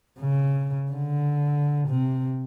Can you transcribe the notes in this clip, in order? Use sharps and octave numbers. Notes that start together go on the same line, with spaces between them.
C#3
D3
C3